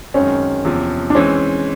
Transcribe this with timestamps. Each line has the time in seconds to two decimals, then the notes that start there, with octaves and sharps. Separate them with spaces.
0.14 F#2 D#3 G#3 C4 C#4
0.65 E2 C3 F3
1.10 D4
1.15 E3 G#3 C4 C#4